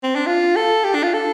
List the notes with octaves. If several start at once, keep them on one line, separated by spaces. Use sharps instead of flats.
C4
D4
F4
A4
G4
D4
F4
A4